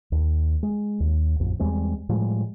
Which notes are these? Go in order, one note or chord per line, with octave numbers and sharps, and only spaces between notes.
D#2
G#3
D#2
A1 F2
E2 G3 G#3 C4
A2 F3 G3 G#3